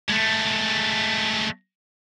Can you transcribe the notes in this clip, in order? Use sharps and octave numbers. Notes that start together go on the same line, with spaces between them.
G#3 A3